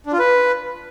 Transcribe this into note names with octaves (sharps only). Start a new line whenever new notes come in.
D4
F4
B4